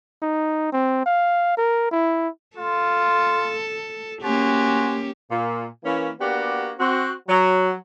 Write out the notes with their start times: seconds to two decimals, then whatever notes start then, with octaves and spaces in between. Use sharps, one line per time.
0.22 D#4
0.73 C4
1.06 F5
1.57 A#4
1.92 E4
2.57 F4 A4
4.22 A#3 C#4 F#4 G4 C5 G#5
5.30 A#2
5.84 E3 A#3 C#4
6.20 A#3 B3 D4 F#4 G4
6.79 C4 F#4
7.28 F#3